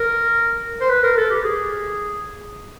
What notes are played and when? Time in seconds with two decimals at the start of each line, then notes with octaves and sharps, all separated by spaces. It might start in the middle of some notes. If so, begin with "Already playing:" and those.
Already playing: A#4
0.81 C5
0.89 B4
1.03 A#4
1.17 A4
1.31 G4
1.44 G#4